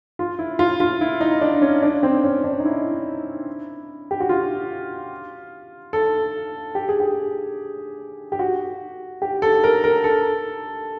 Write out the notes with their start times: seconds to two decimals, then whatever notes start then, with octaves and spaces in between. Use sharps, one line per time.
0.19 F4
0.39 E4
0.59 F4
0.80 F4
1.01 E4
1.21 D#4
1.41 D4
1.62 C#4
1.82 D4
2.03 C4
2.24 C#4
2.44 D4
2.60 D#4
2.65 E4
4.11 G4
4.20 F#4
4.29 F4
5.93 A4
6.75 G4
6.89 G#4
7.00 G4
8.32 G4
8.39 F#4
9.22 G4
9.42 A4
9.64 A#4
9.84 A#4
10.04 A4